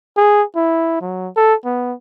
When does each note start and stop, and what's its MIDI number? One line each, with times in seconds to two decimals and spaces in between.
0.17 0.44 68
0.56 0.97 64
1.01 1.28 54
1.36 1.54 69
1.65 1.94 59